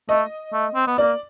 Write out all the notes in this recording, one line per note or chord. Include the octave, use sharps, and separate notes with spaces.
A3 D#5
A3
C4
B3
A#3 D5